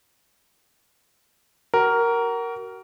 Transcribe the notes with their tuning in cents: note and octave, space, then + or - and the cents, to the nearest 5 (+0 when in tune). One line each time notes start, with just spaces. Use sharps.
F#4 +35 A#4 +0